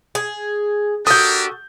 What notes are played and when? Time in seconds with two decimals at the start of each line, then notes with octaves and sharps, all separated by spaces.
0.15 G#4
1.07 D4 F#4 G4 A4 A#4 D#6 G6